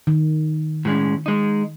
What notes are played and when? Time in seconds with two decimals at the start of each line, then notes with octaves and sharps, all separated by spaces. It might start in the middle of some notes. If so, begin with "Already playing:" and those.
0.07 D#3
0.85 A2 G#3 C#4
1.26 G#3 D#4